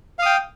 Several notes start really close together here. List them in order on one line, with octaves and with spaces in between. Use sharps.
F5 D#6 G5